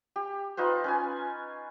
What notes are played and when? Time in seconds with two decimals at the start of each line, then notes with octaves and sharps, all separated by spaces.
0.16 G4
0.57 D#4 F4 B4 C5
0.84 C#4 B4 G#5